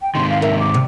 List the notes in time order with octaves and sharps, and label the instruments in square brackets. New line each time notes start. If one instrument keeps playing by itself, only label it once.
[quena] G5
[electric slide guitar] G#2 C3 D#3 [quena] C6
[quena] F5
[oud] A#4 [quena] E5
[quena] D6
[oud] C3